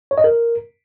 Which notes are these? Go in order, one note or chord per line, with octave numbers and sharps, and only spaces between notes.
C#5
D#5
A#4